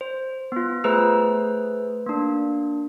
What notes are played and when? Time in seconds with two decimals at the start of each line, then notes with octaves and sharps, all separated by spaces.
0.01 C5
0.52 B3 F4
0.84 A3 G#4 B4 C5 E6
2.06 A#3 D4